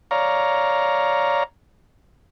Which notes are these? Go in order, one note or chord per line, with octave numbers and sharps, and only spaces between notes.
C#5 D5 F5 A#5